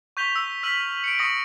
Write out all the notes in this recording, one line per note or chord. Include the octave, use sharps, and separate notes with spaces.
C#6 G6 B6 F7 G7
E6
E6 F6 B6 D#7 F#7
C#7 D7
C#6 D#6 A#6 C#7 F#7